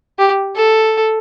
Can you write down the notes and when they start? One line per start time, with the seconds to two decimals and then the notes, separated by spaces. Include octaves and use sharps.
0.18 G4
0.56 A4